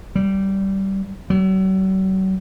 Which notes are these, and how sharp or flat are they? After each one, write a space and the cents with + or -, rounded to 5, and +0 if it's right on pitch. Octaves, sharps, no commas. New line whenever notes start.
G3 -20
F#3 +40